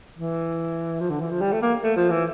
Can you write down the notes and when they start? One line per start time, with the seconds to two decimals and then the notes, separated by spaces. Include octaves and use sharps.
0.18 E3
1.00 F3
1.10 D3
1.21 E3
1.31 F3
1.41 G3
1.52 A3
1.62 A#3
1.83 A3
1.96 F3
2.10 E3